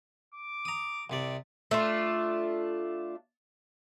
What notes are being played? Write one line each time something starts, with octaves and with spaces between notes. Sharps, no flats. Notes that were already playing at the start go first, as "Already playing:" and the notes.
D6
A#5 D#6
C2 C3 D5
A3 D4 F4